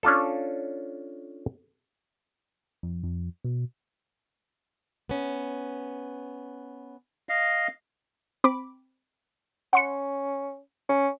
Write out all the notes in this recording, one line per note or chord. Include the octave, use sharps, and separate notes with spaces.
C#4 D4 F4 A4
F2
F2
B2
B3 C#4
D#5 F5
C4 B5 D6
C#4 F#5 C6 C#7
C#4